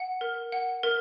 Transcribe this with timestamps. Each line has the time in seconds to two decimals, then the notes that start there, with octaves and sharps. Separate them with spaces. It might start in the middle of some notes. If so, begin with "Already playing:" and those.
Already playing: F#5
0.21 A#4
0.52 F#5
0.83 A#4